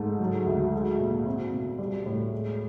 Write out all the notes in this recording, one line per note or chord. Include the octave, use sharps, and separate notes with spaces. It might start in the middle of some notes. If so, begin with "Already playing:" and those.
Already playing: G#2 A3
F#3
D2
G#3
A#2
C4
B2
G3
A2
G#3